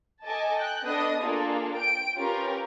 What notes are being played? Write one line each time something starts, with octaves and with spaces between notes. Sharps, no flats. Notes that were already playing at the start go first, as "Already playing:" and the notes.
A4 D#5 G#5 A5 D6
G5 F#6
B3 D4 A4 D#5 D#6
A#3 D4 F4 G#4 A4
G5 D7
C#4 F4 G4 A#4 B4